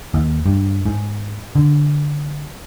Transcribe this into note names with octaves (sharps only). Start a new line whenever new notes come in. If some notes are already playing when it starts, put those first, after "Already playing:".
D#2
G2
G#2
D3